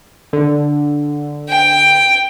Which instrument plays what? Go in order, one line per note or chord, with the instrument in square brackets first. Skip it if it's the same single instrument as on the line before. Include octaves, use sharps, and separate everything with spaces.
[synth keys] D3
[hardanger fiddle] G5